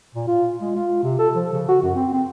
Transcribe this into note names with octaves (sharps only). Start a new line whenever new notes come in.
A#2
F4
G#3
F4
C3
A4
F3
C#3
F#4
F#2
C4
C4